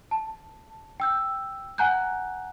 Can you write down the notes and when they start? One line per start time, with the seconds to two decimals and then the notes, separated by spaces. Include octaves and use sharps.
0.11 A5
1.00 G5 E6 G6
1.78 F#5 G#5 A#5 F#6 G6